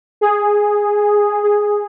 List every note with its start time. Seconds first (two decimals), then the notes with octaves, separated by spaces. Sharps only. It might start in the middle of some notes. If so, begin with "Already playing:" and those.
0.21 G#4
1.43 G#4